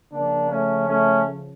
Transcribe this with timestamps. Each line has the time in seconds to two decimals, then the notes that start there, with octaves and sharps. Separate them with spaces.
0.12 C#3 F3 A#3 D4
0.50 A3 C#4
0.88 A3 C#4